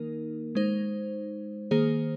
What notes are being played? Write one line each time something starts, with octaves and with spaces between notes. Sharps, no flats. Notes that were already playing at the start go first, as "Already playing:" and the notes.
Already playing: D#3 A#3 D#4 A#4
G#3 D#4 C5
D#3 A#3 G#4 C5